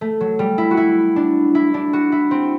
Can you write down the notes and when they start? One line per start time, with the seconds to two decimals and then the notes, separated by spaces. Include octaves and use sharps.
0.01 A3
0.21 F#3
0.39 G3
0.58 E4
0.71 F#4
0.77 E4
1.16 D4
1.55 E4
1.74 D4
1.93 F#4
2.12 E4
2.31 C4